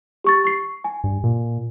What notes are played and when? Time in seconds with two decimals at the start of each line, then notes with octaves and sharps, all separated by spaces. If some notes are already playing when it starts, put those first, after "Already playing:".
0.24 G4 C#6 A6
0.44 C#6 C7
0.84 G#5
1.04 G2
1.24 A#2